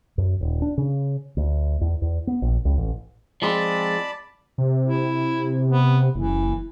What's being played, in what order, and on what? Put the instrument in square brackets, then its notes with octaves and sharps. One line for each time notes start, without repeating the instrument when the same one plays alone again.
[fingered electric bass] F#2
D#1
D4
C#3
D2
E2
E2
B3
A#1
C#2
A1
[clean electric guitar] F3 G#3 C4 [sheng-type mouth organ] D5 A5 B5
[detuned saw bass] C3
[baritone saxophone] E4
B3
[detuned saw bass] F#1 [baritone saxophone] E3